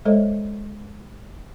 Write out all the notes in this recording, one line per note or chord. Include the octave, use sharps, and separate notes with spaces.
G#3 A4 C5 C#5 D#5